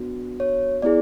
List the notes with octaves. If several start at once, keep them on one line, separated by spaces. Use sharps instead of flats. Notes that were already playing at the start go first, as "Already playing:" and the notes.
Already playing: B3 D4 F#4
C#5
B3 E4 G#4 D5